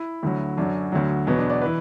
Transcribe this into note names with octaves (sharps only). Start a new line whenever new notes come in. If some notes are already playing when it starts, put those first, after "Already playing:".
Already playing: E4
D2 D3 F#3
F#2 D3 F#3 D4
D2 D3 F#3
E2 B2 F#3 B3
D4
D5
E3 B4